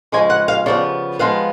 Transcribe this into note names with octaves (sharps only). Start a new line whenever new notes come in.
C#3 F3 G#3 G#5
F#5
F5
C#3 F3 B3 D5
F3 G#3 B3 F5